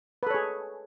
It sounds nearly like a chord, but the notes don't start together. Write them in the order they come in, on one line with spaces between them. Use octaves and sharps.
B4 A4 C#5 G#4